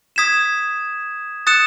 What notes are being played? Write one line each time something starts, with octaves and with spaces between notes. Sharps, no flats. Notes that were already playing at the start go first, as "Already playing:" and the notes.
D#6 G#6 B6 E7
D#6 F#6 A6 C#7 E7